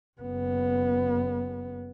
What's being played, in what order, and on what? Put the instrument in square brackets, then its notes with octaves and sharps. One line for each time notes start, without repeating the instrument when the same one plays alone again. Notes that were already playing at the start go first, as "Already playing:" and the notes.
[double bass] F#1 B3